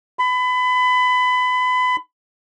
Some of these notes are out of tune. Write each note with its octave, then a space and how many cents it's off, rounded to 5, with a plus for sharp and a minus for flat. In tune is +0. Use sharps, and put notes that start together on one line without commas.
B5 +25